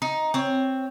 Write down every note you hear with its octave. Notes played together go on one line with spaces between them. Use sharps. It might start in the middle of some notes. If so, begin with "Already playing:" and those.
D#4
C4 C#5